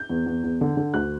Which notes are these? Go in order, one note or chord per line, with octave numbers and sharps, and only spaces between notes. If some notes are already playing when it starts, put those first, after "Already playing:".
Already playing: G6
E2
E2
E2
D3
D3
D2 F#6